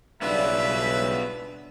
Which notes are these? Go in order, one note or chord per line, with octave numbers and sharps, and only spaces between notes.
B1 C#3 G3 B3 D4 F4 B4 E5